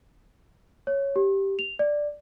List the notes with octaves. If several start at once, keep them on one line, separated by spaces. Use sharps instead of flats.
C#5
G4
F7
D5